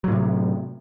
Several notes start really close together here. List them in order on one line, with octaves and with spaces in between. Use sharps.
F#3 A2 C3